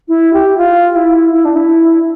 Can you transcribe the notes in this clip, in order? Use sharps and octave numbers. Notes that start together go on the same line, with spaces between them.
E4
G4
F4
E4
E4
D4
E4